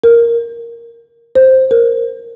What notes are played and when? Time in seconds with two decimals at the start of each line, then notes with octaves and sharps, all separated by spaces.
0.04 A#4
1.35 C5
1.71 A#4